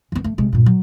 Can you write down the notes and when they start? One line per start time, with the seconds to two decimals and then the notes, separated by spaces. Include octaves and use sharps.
0.12 E3 B3
0.24 A3
0.38 C3 G#3
0.53 G2 A#2
0.66 F#3